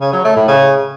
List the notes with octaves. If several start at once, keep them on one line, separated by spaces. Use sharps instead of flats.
C#3
F#3
A3
A2
C#3